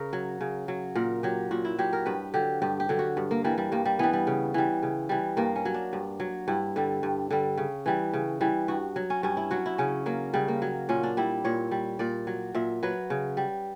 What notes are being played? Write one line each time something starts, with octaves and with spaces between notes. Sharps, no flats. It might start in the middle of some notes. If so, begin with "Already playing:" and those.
Already playing: C#3 A#4
F#3
C#3
F#3
A#2 A#4
F#3 G4
A#2 F#4
E4
F#3 G4
A#4
G2 B4
D3 F#3 G4
G2 G4
G4
D3 F#3
F#4
G2
A#3
E3 G3 A#3
G3
G2 A#3
G3
E3 G3 B3
G3
C#3
E3 G3
C#3
E3 G3
G2 A#3
C#4
F#3
D4
G2
F#3
G2 E4
D3 G3
G2
D3 G3
C#3
E3 G3
C#3
E3 G3
G2 F#4
F#3
C#4
G2 C#4
E4
F#3 F#4
E4
C#3 C#4
F#3 A#3
C#3 G3
A#3
F#3
A#2 C#4
D4
G3 E4
A#2 C#5
G3
A#2 D5
F#3
A#2 E5
F#3 B4
C#3
G3